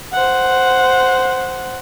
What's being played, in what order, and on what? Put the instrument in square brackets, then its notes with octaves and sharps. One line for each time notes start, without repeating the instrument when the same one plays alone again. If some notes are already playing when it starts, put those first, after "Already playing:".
[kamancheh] C5 F#5